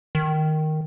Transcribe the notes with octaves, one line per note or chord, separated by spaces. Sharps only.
D#3